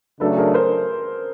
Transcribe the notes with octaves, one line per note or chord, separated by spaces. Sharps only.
C#3 F#3 A3 D4 A4 B4
G#4 A#4
A#4 C5